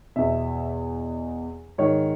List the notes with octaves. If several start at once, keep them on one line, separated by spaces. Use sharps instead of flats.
E2 B2 E5
G#2 D#3 C#5